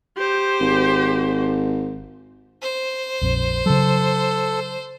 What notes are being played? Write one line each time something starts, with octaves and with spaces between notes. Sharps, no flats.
G4 C5
G#1
C5
A#1 F2
C#3 F#3 A4